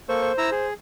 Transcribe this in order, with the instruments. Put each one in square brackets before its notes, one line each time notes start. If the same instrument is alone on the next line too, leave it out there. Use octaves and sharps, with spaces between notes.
[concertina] A#3 A4 C#6 [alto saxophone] C5
[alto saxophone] C5
[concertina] E4 A#5 E6
G#4